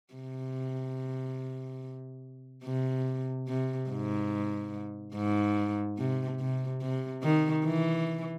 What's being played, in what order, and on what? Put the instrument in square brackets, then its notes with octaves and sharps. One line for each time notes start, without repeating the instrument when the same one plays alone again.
[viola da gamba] C3
C3
C3
G#2
G#2
C3
C3
C3
D#3
E3